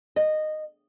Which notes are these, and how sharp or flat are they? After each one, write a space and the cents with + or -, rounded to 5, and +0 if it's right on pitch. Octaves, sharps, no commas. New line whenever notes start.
D#5 -15